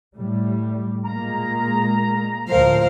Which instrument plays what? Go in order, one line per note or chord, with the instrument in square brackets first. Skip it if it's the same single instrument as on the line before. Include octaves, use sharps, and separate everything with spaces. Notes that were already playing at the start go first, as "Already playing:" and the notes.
[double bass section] A2 G3
[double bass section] A#2 G#3 A#3 [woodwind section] A#5
[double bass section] D2 A2 F3 [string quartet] A#4 C5 F5